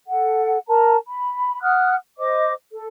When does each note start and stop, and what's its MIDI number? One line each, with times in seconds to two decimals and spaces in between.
0.07 0.58 69
0.07 0.58 78
0.68 0.96 70
0.68 0.96 81
0.68 0.96 82
1.07 1.58 83
1.61 1.95 78
1.61 1.95 87
1.61 1.95 89
1.61 1.95 90
2.17 2.52 72
2.17 2.52 75
2.17 2.52 86
2.72 2.86 69